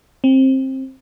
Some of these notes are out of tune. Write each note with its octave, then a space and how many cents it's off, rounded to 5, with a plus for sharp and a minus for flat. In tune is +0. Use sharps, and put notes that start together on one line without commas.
C4 +20